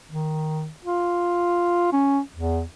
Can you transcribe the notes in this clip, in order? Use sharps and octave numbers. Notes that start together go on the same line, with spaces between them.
D#3
F4
C#4
E2